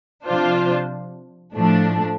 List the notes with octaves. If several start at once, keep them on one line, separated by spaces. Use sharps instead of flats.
C3 F3 D4 F4 C5
A2 F3 A3 D4